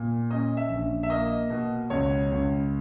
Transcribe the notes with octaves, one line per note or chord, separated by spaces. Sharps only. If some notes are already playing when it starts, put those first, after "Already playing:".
Already playing: A#2
C#4 D#5
E5
A#1
E5
A#3 D#5
B2
C#2 C#5
C#2